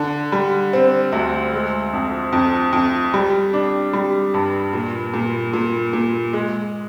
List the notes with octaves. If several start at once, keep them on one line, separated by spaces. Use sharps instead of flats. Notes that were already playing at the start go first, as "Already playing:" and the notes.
Already playing: D3
G3
C4
D2
G#3
F2
F2
F2
G3
D4
G3
G2
A#2
A#2
A#2
A#2
G#3